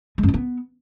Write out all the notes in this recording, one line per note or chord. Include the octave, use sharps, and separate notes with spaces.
G#3
F#2
E3
B3